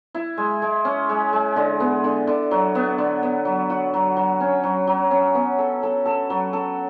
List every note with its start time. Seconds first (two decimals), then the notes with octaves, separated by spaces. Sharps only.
0.15 E4
0.38 G#3
0.62 G#3
0.85 C#4
1.09 G#3
1.33 G#3
1.56 D3
1.80 B3
2.04 D3
2.27 D3
2.51 F#3
2.75 B3
2.98 D3
3.23 B3
3.45 F#3
3.70 F#4
3.94 F#3
4.16 F#3
4.41 C#4
4.63 F#3
4.87 F#3
5.11 C#4
5.35 B3
5.59 A4
5.83 A4
6.05 A4
6.30 F#3
6.53 A4